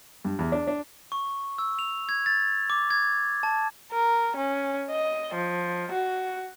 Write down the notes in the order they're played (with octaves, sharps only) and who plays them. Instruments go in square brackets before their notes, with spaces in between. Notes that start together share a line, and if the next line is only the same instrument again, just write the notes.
[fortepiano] G2
E2
D4
D4
[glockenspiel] C#6
E6
F7
G#6
A6
D6
G#6
A5
[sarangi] A#4
C#4
D#5
F3
F#4